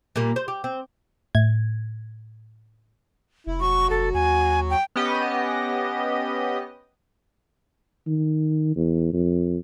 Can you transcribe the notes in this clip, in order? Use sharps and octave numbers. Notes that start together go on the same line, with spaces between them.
A#2 G3 A#3
C5
G4
C4
A2 G#6
F1 E4
F#3 F#4 C#6
F1 A4
D#2 G#5
G5
B3 C#4 G4 D#5
D#3
E2
F2